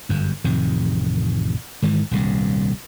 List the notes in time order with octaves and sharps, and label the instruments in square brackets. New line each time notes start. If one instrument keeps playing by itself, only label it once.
[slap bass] G1 F#2
A1 F2 C3 D#3
G#2 D#3 E3
D#1 C2 G2